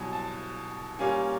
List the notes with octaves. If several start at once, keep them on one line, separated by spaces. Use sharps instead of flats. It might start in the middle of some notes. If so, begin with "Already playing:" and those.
Already playing: C2 B2 F#3 G#5
A5
A#2 G3 A#3 C#4 G#5